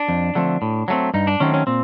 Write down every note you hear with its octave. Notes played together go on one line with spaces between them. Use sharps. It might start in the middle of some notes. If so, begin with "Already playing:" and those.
Already playing: D4
F2
D3 F3 A3 C4
A2
F#3 A3 C4
G2 D#4
D4
D#3 F#3 A3 C4 C#4
C#4
A#2 C4